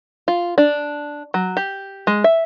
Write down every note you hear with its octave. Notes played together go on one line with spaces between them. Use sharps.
F4
D4
F#3
G4
G#3
E5